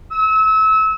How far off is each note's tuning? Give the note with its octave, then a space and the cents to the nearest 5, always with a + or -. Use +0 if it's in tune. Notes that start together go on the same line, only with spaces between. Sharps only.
E6 -30